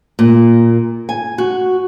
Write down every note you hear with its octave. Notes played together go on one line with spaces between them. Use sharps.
A#2
G#5
F#4